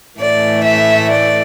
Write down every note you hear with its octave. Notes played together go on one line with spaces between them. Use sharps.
A2 E3 A3 D5
E5
D5